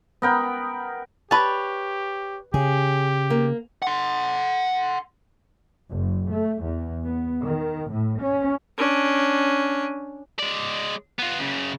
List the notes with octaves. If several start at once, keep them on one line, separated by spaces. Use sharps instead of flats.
B3 A#4 G5 B5
G4 B4 C#5 A5
C#3 G4 G#4
A#3
F#5 C6
F#1
A3
E2
B3
D#3
A2
C#4
C#4 D4
G#3 D5
B3 F4
F#2 C#3